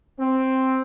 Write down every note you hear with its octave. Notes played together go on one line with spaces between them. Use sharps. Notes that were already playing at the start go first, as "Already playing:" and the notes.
C4